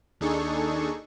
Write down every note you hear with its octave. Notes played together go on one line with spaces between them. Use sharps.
D#2 D4 D#4 G#4 A4 C#6